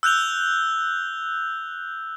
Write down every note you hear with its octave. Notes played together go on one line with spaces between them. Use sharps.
E6 F#6 G6 F7 G7